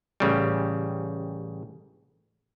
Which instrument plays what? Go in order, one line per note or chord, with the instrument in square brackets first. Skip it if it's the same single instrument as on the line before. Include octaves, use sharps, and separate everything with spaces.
[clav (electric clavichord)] A1 C#3 G3